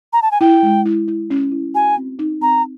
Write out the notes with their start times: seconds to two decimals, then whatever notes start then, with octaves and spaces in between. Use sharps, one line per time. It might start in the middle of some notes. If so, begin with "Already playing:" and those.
0.13 A#5
0.22 A5
0.31 G#5
0.41 E4 G5
0.63 G#3
0.86 E4
1.08 E4
1.30 C#4
1.52 E4
1.74 F#4 G#5
1.97 C4
2.19 D#4
2.41 C4 A#5